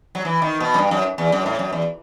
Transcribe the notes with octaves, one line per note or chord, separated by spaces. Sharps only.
F#3
E3
D#3
B2
F#2
G2
F#2
E2
F#2
A2
F#2
E2